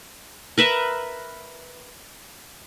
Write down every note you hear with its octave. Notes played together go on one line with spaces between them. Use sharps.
A#4 B4 E5